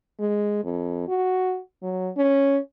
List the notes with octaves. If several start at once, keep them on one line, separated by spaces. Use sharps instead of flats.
G#3
F2
F#4
F#3
C#4